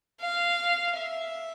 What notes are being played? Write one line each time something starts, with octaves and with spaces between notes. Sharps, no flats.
F5
E5